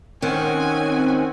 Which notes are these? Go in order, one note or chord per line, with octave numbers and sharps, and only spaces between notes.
D#3 C4 C#4 F#5 G#5